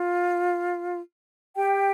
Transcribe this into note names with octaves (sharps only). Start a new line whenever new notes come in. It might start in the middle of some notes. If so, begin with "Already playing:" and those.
Already playing: F4
G4 G5